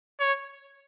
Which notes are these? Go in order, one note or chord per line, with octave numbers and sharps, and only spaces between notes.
C#5